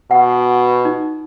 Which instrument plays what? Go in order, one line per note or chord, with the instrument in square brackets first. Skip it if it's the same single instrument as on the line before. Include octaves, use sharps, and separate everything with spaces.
[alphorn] B2 [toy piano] F#5
[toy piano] D#4